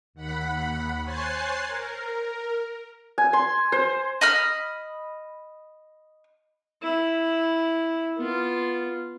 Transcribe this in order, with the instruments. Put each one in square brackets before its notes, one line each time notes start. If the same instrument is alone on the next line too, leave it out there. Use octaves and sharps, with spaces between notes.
[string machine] D#2 F#5 B5
C5 C#5 G#5 F#6 A6 C7
A#4
[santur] G#5
C6
C5
[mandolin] D#5 B5 F6
[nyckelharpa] E4
B3 F4